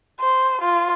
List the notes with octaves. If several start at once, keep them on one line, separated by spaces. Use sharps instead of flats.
C5
F4